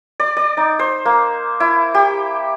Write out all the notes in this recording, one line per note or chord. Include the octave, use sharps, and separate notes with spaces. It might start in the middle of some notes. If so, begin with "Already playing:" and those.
D5
D5
D#4
C5
A#3
E4
G4